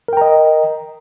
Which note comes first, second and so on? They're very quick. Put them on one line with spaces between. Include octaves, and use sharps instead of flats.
A#4 G5 A#5 D#5